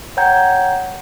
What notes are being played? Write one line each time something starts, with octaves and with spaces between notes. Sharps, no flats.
C#5 F#5 G5 A#5 G6 G#6